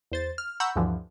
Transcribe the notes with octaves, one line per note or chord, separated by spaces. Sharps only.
E2 C5 A6
F6
F#5 A#5 B5 C#6 E6 G6
D2 G2 D3 E3 F3